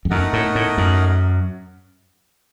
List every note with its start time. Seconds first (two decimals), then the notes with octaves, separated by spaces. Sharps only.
0.05 F2
0.10 F#2 A3 D#4 A#4 D#5 F#5
0.33 A2
0.55 A2
0.78 F#2